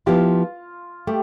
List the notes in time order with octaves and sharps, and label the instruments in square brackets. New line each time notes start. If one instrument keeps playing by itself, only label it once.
[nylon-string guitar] F3 B3 E4 G4 [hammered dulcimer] F4
[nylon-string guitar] A3 [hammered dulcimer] G4